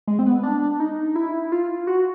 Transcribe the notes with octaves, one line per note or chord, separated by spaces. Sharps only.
G#3
C4
B3
D4
D#4
E4
F4
F#4